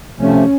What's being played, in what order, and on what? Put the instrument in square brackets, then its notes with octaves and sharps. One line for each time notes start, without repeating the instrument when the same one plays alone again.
[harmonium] C3 F3 A3 [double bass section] C#4